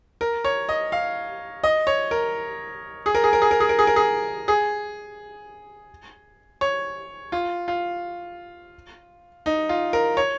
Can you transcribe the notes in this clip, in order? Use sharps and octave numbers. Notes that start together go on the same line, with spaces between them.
A#4
C#5
D#5
F5
D#5
C#5
A#4
G#4
A#4
G#4
A#4
G#4
A#4
G#4
A#4
G#4
A#4
G#4
G#4
C#5
F4
F4
D#4
F4
A#4
C#5